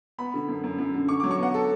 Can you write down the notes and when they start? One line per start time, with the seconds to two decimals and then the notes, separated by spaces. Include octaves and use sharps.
0.18 B3 B5
0.34 D3
0.48 F#2
0.63 F#2
0.78 F#2
0.94 D3
1.09 D3 C#6
1.20 F#3 D6
1.31 C#6
1.38 B3 F#5
1.54 A4